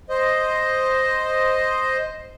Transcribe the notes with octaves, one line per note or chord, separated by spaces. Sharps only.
C5 D#5